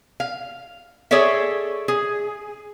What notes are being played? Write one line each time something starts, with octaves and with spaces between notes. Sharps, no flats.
F5
G#4 A4 C#5 D5 E5
G#4